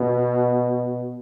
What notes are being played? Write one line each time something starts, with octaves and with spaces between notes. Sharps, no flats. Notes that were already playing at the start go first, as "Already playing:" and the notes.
Already playing: B2